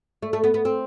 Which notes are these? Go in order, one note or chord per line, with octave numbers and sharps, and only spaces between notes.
A3
A3
B3
B3
C4